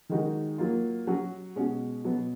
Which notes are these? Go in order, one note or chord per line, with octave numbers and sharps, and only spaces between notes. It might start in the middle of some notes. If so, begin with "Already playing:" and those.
D#3 G#3 D#4 F#4
F#3 A#3 F4
F#3 C#4 F#4
B2 G#3 C#4 F#4
B2 F#3 B3